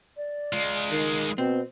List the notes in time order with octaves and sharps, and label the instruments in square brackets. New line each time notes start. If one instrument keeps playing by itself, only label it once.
[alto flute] D5
[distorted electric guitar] G#3 F4
[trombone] D#3
[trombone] B2 [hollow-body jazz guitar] C4 [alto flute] C5